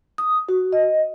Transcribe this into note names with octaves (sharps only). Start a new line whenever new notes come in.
D#6
F#4
D#5